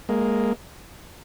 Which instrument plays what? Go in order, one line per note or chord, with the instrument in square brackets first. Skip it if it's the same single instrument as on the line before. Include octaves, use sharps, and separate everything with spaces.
[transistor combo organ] G#3 A#3